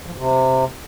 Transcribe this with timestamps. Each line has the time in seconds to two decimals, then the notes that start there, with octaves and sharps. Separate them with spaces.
0.06 F3
0.12 G#2
0.17 C3